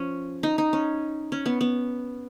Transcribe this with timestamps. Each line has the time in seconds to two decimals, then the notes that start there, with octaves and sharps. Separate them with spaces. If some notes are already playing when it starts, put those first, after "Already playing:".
Already playing: F3 C#4
0.43 D#4
0.58 D#4
0.73 C#4
1.32 C#4
1.46 B3
1.61 B3